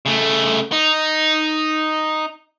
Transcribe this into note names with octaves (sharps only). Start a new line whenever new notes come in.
C#3 A3
D#4